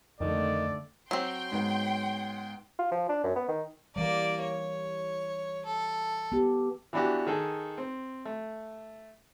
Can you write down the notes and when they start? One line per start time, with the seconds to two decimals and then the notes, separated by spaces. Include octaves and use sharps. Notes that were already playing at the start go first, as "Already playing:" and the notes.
0.21 F2 D3 D#3 A3 D5
1.11 F#3 C4 G5 C6
1.52 G#2 B3
2.79 F4
2.92 F3
3.09 D4
3.24 F#2
3.36 B3
3.48 D#3
3.96 E3 G3 A#3 D5
4.42 C#5
5.66 A4
6.32 B3 G4
6.93 E3 B3 D4 F#4 G4
7.27 D#3 G#4 A4
7.78 C4
8.25 A3